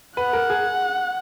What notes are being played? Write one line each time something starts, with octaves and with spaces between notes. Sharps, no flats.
B4 F#5
A#4
G#4